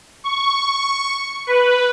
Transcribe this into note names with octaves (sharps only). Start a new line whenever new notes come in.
C#6
B4